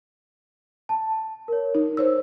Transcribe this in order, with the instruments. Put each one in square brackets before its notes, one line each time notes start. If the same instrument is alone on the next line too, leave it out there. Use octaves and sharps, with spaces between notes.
[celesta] A5
A#4 C#5
[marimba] D#4
C5 C#5 E6